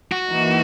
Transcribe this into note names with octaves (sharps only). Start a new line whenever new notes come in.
F#4
E3 A#3 D#4